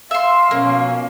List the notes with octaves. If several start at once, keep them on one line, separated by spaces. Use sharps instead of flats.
E5 F5 C6
B2 F3 A#3 C#4